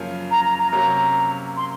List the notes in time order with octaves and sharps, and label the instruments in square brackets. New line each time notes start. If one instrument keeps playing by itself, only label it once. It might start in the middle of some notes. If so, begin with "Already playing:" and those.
Already playing: [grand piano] F#2 C#3 F3 A#3 C#4
[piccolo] A#5
A#5
A#5
[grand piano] C3 F#3 A#3 C#4 [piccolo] A#5
[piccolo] C6